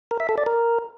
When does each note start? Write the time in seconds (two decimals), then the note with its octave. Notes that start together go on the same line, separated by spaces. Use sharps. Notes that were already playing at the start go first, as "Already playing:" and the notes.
0.11 A#4
0.20 E5
0.29 A4
0.38 D5
0.46 A#4